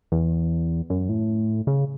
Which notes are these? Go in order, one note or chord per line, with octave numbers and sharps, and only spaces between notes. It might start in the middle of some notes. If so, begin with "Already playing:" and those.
E2
F#2
A2
C#3